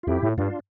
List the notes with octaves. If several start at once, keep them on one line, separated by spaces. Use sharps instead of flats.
F4
F2 E4 G4
A2
G2 D4 F4